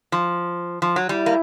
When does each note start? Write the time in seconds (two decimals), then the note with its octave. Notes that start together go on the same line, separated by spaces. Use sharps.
0.12 F3
0.82 F3
0.96 F#3
1.09 G3 E4
1.26 A#3